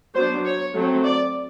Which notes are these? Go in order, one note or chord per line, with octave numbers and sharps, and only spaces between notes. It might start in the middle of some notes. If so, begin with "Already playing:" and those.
F#3 B3 D4 C5
C#5
F#3 A3 C4
D5